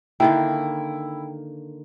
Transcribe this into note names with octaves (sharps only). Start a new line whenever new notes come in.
D3 D#3 A#3 E4 G5